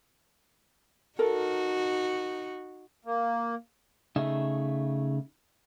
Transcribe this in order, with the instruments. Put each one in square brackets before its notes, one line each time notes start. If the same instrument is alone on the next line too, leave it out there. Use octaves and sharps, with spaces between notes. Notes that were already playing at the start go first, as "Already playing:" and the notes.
[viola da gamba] D#4 F#4 [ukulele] A4 A#4
[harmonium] A#3
[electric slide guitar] C#3 A3 D#4 G#4 E5